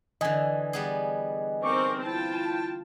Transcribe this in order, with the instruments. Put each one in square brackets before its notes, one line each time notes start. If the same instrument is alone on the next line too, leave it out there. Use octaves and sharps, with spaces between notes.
[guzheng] D3 E3 [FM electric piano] D#5 G#5
[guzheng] G3 B3 G#4
[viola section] C4 D#4 A#4 [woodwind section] C#6 D6
[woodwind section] E4 G5 [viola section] F4 A5